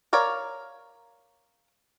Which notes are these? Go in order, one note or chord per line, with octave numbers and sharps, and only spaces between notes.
A#4 C#5 D5 F5 A#5